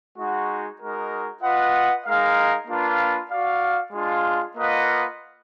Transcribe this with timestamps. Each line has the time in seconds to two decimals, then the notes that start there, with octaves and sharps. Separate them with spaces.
0.18 G#3 D#4 F#4
0.80 G#3 D#4 F#4 A#4
1.43 F4 B4 D#5 F#5
2.06 G#3 D#4 A#4 F5
2.67 A#3 D4 F4 B4
3.31 F#4 D5 F5
3.93 G#3 D4 F4
4.56 A#3 F4 B4 D#5 F#5